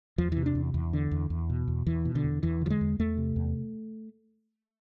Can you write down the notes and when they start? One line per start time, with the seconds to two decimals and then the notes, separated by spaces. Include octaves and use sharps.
0.18 E2 F3
0.32 C3 E3
0.46 D4
0.55 E2
0.74 E2
0.93 D3
1.11 E2
1.30 E2
1.50 B2
1.68 E2
1.87 E2 E3
2.05 B2
2.15 D3
2.24 E2
2.43 E2 E3
2.61 D3 F3
2.70 G#3
2.81 E2
2.99 E2 A3
3.17 C3
3.36 E2